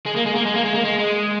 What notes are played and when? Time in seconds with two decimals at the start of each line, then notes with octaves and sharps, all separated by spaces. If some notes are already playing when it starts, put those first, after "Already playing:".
0.06 G#3
0.16 A#3
0.26 G#3
0.35 A#3
0.45 G#3
0.55 A#3
0.64 G#3
0.74 A#3
0.84 G#3
0.99 G#3